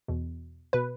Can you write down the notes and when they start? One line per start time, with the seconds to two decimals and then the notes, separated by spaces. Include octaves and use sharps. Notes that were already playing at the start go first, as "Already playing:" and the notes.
0.08 E2 B2
0.73 B2 B4